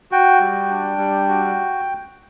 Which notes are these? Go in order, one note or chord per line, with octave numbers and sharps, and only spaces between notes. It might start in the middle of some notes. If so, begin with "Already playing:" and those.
F#4 G5
G3
D4
G3
F#4